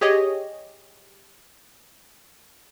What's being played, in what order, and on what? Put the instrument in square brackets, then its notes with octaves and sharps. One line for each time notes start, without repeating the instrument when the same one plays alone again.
[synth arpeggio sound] G4 G#4 C#5 D#5